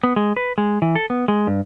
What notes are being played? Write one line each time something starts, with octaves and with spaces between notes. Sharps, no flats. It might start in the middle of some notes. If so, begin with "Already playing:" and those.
B3
G#3
B4
G#3
E3
A4
B3
G#3
G2